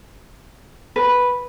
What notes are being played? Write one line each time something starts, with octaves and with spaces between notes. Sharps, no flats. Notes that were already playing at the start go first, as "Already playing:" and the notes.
B4